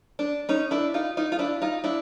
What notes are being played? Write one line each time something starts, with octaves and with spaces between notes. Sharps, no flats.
D4
C#4 D#4
D4 E4
D#4 F4
D#4 F4
F4
D4 E4
D#4 F4
D4 E4